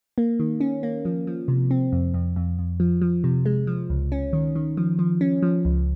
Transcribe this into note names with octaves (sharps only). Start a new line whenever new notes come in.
A#3
D#3
C#4
A#3
F3
F3
C3
C4
F2
F2
F2
F2
F3
F3
C3
G#3
F3
C#2
C#4
D#3
D#3
F3
F3
C#4
F3
C#2